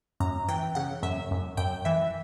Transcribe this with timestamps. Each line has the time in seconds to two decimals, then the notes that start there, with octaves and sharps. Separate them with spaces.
0.20 F#2 A#5
0.48 E3 G5
0.75 C#3 F#5
1.03 F#2 E5
1.31 F#2
1.57 F#2 G5
1.85 E3 E5